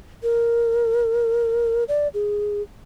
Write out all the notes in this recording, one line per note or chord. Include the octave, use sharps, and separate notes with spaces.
A#4
D5
G#4